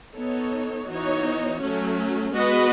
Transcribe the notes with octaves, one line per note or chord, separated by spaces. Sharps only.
B3 D#4 A4 C#5
E3 B3 D#4 F#4 C#5
F#3 A3 C#4
G#3 B3 F#4 B4 D#5